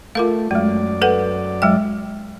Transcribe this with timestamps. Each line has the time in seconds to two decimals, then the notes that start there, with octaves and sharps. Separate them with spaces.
0.15 A3 F4 A#4 F5
0.51 F#2 G#3 A3 D5
1.02 A4 B4 F#5
1.62 F#3 G#3 G5